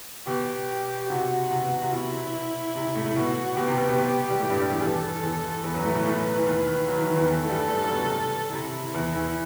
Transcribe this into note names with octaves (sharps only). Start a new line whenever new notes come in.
B2 G4
C3 F#4
C3
B2
C3
C3
B2 E4
C3
C3
A2 A3
A2 A3
B2 F#4
B2 G4
C3
B2 B3
B2 B3
B2 B3
G3
A2 A3
G2 G3
G2 G3
E2 E3
E2 E3 A4
E2 E3
E2 E3 B4
F#2 F#3
A2 A3
B2 B3
A2 A3
E3
D#2 D#3
F#3
E3
D#3
E2 E3
E2 E3 A4
A3
G2 G3
G2 G3
F#2 F#3
B2
C3
C3 E4
E2 E3
E2 E3